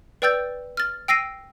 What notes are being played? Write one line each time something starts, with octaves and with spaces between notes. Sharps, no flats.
B4 D5 G5 E6 G6 A6
F6 A6
G5 E6 A#6 C7 D#7